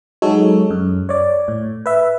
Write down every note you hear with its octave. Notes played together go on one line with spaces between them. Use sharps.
F#3 G#3 D#4 A4 C#5
F#2
C#5 D5
A2
B4 E5